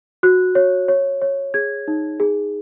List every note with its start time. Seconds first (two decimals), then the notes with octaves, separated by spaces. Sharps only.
0.23 F#4 F#6
0.55 C#5
0.88 C#5
1.22 C#5
1.54 G#4 G#6
1.88 D#4
2.20 G#4